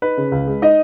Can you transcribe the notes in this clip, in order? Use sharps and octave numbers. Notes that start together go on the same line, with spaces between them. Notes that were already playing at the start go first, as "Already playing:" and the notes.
D#4 B4
C#3
C#2
G#3
D#4 D#5